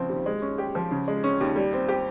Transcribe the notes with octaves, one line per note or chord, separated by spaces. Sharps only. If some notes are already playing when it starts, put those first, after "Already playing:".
Already playing: C#3 F3 C4
D#2
G#3
C#4
G4
F3
C#3
G#3
C#4
D#2
G3
C4
G4